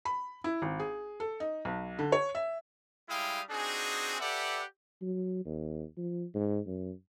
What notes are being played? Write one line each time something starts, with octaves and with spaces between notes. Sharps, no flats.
B5
E4
G#1
G#4
A4
D#4
B1
D3
C#5
E5
G3 G#3 E4 F5 G5 D#6
C4 D4 D#4 F#4 G#4
G4 A4 B4 D5 E5 F#5
F#3
D#2
F3
G#2
F#2